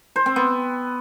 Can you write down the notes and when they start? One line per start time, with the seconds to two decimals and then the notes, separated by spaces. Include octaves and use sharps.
0.16 C5
0.26 C4
0.36 B3